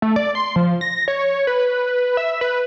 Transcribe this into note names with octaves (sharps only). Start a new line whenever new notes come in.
A3
D5
C6
F3
A#6
C#5
B4
E5
B4